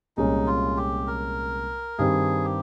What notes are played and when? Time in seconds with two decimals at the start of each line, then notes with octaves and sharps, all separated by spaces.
0.17 C2 A#2 G#3 C#4 D#4
0.47 F4
0.77 G4
1.07 A#4
1.98 G2 D#3 G3 C4 G#4
2.44 G4